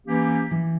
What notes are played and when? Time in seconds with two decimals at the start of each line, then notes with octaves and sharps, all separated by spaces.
0.06 E3 A#3 C#4 G4
0.51 E3